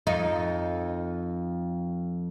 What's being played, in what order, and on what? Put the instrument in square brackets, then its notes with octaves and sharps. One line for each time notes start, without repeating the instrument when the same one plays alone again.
[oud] F2 D#4